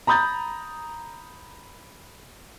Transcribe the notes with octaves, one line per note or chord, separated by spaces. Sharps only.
A#5 B5 D#6 G6 A6